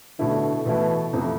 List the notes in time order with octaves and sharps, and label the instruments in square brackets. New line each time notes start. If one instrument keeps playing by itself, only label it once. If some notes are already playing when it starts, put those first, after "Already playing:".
[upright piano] B2 A3 E4 [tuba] D3
[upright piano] B2 A3 E4 [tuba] E3
[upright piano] F2 C3 E3 A3